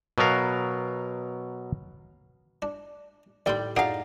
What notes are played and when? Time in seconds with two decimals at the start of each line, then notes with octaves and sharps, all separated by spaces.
0.18 B2 F#3 B3 A#4 F5
2.62 D4
3.46 D#2 A2 G3 D5 G5 C6
3.76 F#2 D4 D#4 G#4 F5 F#5